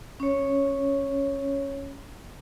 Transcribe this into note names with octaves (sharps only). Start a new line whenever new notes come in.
C#4 C#5